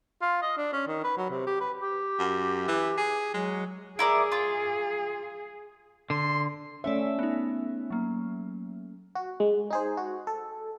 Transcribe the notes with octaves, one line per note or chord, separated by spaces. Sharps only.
F4
D#5
D4
C#4
D#3
B4
F#3
C3
G4
B4
G4
F#2
E3
G#4
F#3 G#3
E4 G#4 A#4 D5
F4
D3 C6
A3 C#4 C#5 D5 E5
B3 D#4
F#3 A#3
F#4
G#3
D#4 G#4 C5
F#4
A4